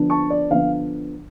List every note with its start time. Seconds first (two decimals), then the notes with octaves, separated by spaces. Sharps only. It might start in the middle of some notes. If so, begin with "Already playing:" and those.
Already playing: D3 F3 B3 D4
0.10 A5 C#6
0.30 D5
0.50 D3 F3 B3 D4 F5